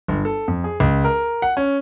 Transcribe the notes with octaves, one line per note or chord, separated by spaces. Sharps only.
G1
A4
F2
G#4
C#2
A#4
F#5
C#4